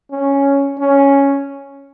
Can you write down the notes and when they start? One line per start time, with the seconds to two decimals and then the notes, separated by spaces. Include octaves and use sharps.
0.11 C#4
0.79 C#4